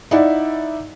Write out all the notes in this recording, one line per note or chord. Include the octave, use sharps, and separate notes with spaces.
D#4 E4 D5 E5 F#5